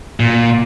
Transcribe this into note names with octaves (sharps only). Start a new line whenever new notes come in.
A#2